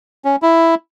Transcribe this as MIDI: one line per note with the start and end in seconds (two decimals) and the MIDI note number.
0.25 0.36 61
0.42 0.75 64